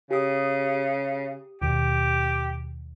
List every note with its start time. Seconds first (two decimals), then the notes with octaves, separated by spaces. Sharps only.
0.11 C#3 G4 D#6
1.62 D#2 B2 G4